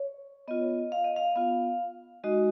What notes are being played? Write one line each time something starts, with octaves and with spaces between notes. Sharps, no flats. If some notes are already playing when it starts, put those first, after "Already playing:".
Already playing: C#5
B3 F4 D#5
F5
D#5
F5
B3 F4 F5
G#3 D#4 F#4 D#5